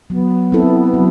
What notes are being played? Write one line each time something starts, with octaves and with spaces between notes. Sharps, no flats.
F#3 B3
C4 E4 A4
F#3